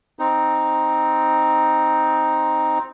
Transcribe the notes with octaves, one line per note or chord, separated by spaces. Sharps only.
C4 D#4